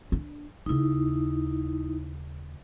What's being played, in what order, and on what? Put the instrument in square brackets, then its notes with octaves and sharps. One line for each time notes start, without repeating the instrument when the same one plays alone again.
[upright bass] D4
[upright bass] D#2 C#3 [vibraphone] D#4 E4